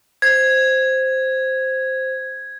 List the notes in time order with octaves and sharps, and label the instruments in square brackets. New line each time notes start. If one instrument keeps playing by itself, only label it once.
[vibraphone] C5 [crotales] G#6